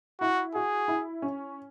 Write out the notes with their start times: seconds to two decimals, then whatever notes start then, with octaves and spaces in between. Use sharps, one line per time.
0.20 E4 F#4
0.55 F#4 G#4
0.88 E4
1.22 C#4